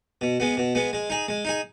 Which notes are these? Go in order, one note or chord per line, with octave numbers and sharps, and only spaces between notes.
B2
G#3 B3
B2
G#3 B3
G#3
D#4 G#4
G#3
D#4 G#4